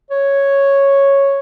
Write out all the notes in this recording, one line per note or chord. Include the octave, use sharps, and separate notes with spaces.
C#5